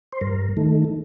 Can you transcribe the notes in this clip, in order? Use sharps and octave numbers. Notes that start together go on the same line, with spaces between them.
C5
G2 A#4
D#3 A3